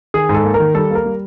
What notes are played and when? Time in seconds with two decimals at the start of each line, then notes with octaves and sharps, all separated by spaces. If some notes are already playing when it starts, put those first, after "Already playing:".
0.14 D#3 G#4
0.29 G#2
0.34 A4
0.44 A#3
0.54 A#4
0.60 D#3
0.75 G3 A4
0.91 A#3 A#4
1.06 G3